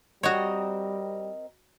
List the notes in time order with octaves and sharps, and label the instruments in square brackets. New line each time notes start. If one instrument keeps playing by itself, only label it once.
[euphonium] G3 [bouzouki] C4 A#4 D#5 [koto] F#4 C#5